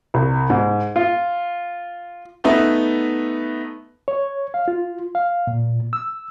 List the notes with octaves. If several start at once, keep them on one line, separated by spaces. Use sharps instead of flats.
C2
G#2
F4
A3 B3 D#4 B4 E5
C#5
F5
F4
F5
A#2
E6